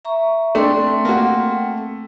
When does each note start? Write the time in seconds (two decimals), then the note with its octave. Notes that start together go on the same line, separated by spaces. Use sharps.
0.05 E5 A#5 C#6
0.55 A3 C4 D4 G5 C6
1.05 A#3 F#4